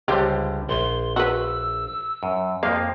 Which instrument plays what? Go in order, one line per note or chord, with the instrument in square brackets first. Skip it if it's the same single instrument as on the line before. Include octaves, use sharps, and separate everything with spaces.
[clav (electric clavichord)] C#2 D3 G3 [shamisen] G4 C5
[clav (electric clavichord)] A#1 [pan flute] C6
[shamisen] F#4 B4 [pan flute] E6
[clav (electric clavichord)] F#2
[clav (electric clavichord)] F2 F3 A#3 [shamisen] F5